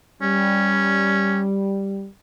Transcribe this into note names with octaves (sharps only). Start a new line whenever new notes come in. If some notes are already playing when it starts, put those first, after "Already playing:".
G3 C#4